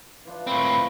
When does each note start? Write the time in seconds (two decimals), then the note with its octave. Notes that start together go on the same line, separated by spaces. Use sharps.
0.25 E3 F3 D4
0.47 A2 A#3 C4 B5